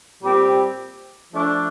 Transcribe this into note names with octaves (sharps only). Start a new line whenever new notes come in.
A#2 G3 C4 G4
F3 A3 D4